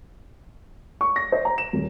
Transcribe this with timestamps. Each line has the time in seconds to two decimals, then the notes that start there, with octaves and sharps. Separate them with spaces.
1.01 C#6
1.16 A#6
1.32 C5
1.45 A#5
1.58 E7
1.73 D#1